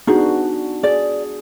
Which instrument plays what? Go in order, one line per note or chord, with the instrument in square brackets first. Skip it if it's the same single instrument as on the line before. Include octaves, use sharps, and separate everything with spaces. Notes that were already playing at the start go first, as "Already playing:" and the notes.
[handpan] B3 D4 F#4 [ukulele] D#4 G#4
[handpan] G#4 [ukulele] D5